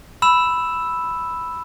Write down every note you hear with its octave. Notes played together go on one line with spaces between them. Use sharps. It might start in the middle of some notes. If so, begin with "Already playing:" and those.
B5 E6 E7